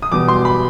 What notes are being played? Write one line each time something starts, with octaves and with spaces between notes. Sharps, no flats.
D#6
E2 B2 G3 B3 D6
C6
B5